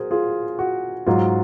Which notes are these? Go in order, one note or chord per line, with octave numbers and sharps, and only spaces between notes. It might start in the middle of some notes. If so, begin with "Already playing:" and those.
Already playing: F#3 G#4 A#4 C5
F4 G#4
F#4
G#2 F#3 F4